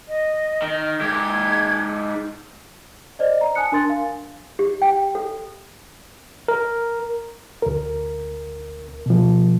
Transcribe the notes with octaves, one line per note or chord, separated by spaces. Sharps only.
D#5
D#3
G#2 G4 G#6
C5 D5 D#5
A#5
G#5 A5 D#6 F#6 C#7
D4 A#4 C6 A6
F5 G#5
G4
G5
A4
A#4
D2 A#4
B2 F3